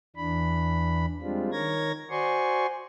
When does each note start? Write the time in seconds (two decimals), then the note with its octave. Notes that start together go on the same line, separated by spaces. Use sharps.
0.16 E2 E3 D4 B5
1.21 G3 G#3 C4 D4 F4
1.52 D#3 A#4 C#5 G#6 A#6
2.10 F#4 C5 D5 G#5 C6 C#6